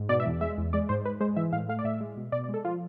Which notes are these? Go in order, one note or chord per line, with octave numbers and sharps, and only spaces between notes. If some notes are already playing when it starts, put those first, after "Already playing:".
Already playing: G#2
B2 D5
E5
E2
G#3 E5
E2
G#3 D5
G#2 C5
G#2 B4
G#3 C5
E3 E5
A2 F5
A3 F5
D5
A2 E5
G#3
B2
B2 D5
D5
G#3
A4
F3 F4